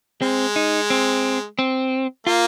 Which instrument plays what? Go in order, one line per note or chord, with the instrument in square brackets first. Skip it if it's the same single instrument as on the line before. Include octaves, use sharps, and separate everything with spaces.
[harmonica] G#3 [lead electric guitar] C4
[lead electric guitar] D#4
C4
C4
[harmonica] A#3 [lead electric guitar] F4